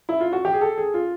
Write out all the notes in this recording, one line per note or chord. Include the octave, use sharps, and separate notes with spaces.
E4
F4
F#4
G4
G#4
A4
G#4
F4